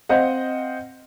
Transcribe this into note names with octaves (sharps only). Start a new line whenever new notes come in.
C4 C5 D#5 F5 F#5